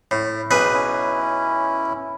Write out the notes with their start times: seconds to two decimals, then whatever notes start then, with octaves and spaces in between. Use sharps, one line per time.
0.11 A2
0.51 B1 G#4 B4
0.73 C#4 E4